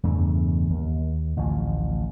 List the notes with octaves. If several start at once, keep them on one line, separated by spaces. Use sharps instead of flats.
E2 G2 C#3 A3
D#2
A1 D2 A2 F3